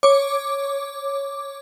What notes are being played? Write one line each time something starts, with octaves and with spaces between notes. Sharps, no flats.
C#5 D6